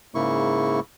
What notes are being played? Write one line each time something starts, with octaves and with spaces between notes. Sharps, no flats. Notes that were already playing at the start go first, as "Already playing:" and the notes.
G#2 C#3 A#3 E4 C#6